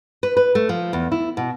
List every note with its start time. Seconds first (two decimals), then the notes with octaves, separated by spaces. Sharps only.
0.23 B4
0.37 B4
0.55 A3
0.69 F3
0.93 E2
1.12 E4
1.37 B2